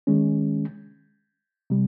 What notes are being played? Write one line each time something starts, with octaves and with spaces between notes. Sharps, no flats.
D#3 G#3 C#4
C3 G3